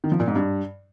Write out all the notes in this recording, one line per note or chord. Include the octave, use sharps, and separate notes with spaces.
D#3
F3
A#2
G#2
G2